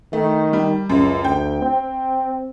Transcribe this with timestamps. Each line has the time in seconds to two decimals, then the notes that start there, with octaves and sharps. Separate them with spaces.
0.13 D#3 A3
0.53 G3
0.89 C#2 F#2
1.24 D2 G5
1.62 C4